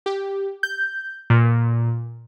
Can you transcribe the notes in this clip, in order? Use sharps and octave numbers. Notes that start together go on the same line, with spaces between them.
G4
G6
A#2